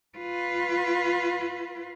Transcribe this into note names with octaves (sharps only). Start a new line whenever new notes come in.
F4 B4